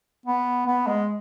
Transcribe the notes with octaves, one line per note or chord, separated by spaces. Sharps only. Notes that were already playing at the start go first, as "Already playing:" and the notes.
B3
B3
G#3